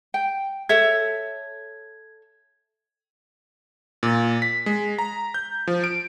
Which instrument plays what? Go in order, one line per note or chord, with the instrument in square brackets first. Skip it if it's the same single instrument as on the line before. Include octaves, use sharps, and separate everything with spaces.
[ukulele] G5
[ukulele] A4 C#5 E5 [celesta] G#6
[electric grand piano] A#2
B6
G#3
A#5
G6
F3
D7